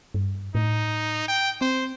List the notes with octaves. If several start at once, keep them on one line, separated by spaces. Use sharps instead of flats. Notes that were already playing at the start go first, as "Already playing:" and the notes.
G2
A2 D#4
G5
C4 C5